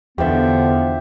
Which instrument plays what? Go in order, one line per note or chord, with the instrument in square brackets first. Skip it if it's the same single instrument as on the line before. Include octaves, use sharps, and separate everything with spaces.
[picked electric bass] E2 D3 [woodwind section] F3 B3 [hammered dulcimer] G4 E5